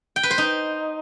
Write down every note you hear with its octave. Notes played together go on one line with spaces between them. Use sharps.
G5
B4
C5
D#4